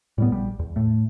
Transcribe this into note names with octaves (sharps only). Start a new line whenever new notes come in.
A2 G3 B3
A#1 G3
E2
A2 A3